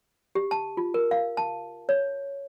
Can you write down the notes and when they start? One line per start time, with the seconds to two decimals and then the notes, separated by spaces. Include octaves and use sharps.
0.35 G4
0.51 A5
0.77 F4
0.94 A#4
1.11 F5
1.37 A5
1.89 C#5